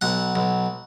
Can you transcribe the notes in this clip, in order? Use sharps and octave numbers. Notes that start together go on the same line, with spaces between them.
B1 F#5
B1